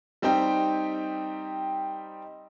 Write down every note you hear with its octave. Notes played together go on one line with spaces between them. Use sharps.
G3 C4 D#4 G4 G5